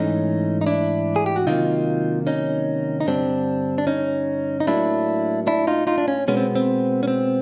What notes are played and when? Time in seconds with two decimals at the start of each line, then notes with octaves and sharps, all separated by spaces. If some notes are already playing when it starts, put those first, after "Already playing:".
Already playing: G#2 E3 A3 C#4 D#4
0.61 D#4
0.67 D4 E4
1.16 G#4
1.26 G4
1.36 F#4
1.47 C3 D#3 F#3 A#3 D#4 F4
2.27 C#4 D#4
3.01 D#4
3.06 G2 D3 G3 C4 D4
3.78 D4
3.87 C#4 D#4
4.60 D#4
4.67 A2 F#3 A#3 D4 E4
5.47 D4 E4
5.67 D#4 F4
5.87 D#4 F4
5.98 D4
6.08 C#4
6.28 B2 G#3 B3 C#4
6.37 C4
6.55 C4
7.03 C#4
7.08 C4